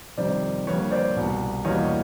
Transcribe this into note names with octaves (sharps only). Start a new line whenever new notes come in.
F2 C3 D#3 G3 C5 D5
F2 D3 G3 A#3 B4 C#5
C5 D5
C2 B2 G3
E2 B2 G3 A#3 C#5 D#5